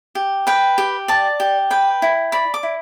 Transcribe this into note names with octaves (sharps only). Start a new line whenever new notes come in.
G4
B4 G5
G4
D5 A5
G4
B4 G5
E4
D5 B5
D6
E4